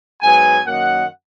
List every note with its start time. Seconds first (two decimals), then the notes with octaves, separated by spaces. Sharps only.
0.21 G#2 F#3 B3 G#5
0.66 F#2 D#3 A#3 F#5